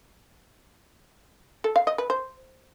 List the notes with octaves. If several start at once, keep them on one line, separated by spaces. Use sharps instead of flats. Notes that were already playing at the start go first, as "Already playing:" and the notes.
A4
F5
D#5
B4
C5